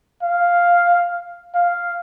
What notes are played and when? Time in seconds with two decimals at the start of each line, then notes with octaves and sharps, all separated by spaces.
0.23 F5
1.55 F5